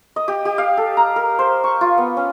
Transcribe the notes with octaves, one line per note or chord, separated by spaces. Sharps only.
D#5
G4
G4
F5
A4
A#5
A#4
C5
C#6
F4
B3
C#4